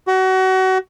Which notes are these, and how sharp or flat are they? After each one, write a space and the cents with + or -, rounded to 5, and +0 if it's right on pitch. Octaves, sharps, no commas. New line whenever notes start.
F#4 +30